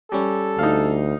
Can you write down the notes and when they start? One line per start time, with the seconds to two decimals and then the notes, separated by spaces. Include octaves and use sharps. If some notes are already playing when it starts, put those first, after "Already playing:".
0.12 G3 C#4 A4
0.59 D2 D#4 F5